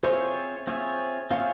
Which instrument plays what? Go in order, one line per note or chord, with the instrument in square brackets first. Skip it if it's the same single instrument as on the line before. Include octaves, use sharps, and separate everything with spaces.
[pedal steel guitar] C4 F4 G#4 C#5 E5 [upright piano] C5
[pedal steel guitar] C4 F4 G#4 C#5 E5
[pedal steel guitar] C4 F4 G#4 C#5 E5 [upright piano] F5